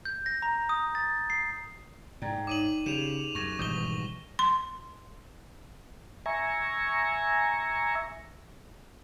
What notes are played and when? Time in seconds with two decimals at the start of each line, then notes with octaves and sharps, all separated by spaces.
0.05 G6
0.26 A#6
0.42 A#5
0.69 D#6
0.95 A6
1.30 C7
2.22 G#2 D5 G5 A#5
2.47 D#4 C#5 D6 D#7 F#7
2.86 C#3 G4 G#4 E7 F7
3.35 F#2 C#6 A#6 E7
3.59 G#1 B2 D#3 E3 G3 D6 G6 G7
4.39 C6
6.26 E5 G#5 A#5 C#6